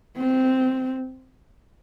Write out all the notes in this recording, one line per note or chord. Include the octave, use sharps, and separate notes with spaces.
C4